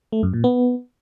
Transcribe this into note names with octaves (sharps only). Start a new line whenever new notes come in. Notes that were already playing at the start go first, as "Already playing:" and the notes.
A3
F#2
A#2
B3